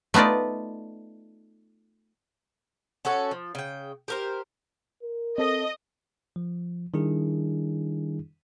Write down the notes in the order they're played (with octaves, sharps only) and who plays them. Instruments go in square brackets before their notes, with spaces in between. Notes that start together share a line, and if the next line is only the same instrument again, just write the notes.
[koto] A3 B3 D#4 F4 D5
[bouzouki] C#4 F#4 A4 C#5
F3
C#3 G5
G4 A#4 C5
[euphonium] A#4
[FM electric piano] C4 A4 A#6 [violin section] D#5
[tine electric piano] F3
D#3 G3 D4 E4 G#4